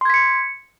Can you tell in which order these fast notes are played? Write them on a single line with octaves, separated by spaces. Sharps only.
C6 G#6 B6 C#7